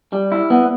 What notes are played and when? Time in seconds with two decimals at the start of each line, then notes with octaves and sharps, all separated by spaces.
0.13 G3
0.32 E4
0.50 B3